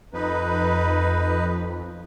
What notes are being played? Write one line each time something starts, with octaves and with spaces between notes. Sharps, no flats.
F2 D#4 B4